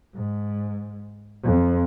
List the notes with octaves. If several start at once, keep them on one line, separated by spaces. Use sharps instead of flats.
G#2
F2